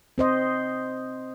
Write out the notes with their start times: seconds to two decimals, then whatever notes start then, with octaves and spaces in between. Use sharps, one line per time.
0.18 C4 C5 D#5